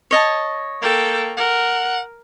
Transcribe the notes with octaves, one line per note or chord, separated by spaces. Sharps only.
C#5 D#5 A5
A#3 A4 G5
A#4 F#5